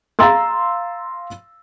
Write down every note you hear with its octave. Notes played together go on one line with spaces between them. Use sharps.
F5 A#5 C6 E6 A6